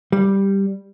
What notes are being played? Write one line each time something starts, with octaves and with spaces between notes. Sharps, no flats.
G3